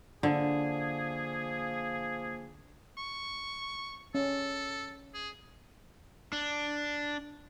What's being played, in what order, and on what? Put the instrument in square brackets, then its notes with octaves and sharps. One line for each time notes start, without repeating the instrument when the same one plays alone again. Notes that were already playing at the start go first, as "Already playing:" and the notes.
[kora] D3 [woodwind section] F3 A#3 G#4
[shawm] C#6
[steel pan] C#4 [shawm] A4
[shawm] G#4
[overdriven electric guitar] D4